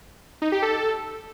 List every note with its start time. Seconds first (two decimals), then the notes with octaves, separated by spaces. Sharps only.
0.42 D#4
0.52 G4
0.62 A4